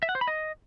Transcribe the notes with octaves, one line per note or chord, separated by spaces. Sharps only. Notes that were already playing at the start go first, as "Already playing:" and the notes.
E5
F#5
C5
B5
D#5